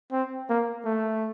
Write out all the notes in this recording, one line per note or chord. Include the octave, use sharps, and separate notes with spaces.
C4
A#3
A3